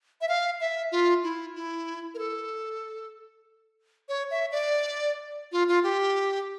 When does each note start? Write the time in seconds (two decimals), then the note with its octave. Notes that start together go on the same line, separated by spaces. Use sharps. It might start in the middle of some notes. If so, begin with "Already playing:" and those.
0.21 E5
0.29 F5
0.60 E5
0.92 F4
1.24 E4
1.55 E4
2.14 A#4
2.19 A4
4.09 C#5
4.31 E5
4.52 D5
5.52 F4
5.68 F4
5.83 G4